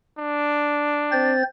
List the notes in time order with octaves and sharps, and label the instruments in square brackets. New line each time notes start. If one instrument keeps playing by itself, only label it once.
[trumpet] D4
[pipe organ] C4 C5 A6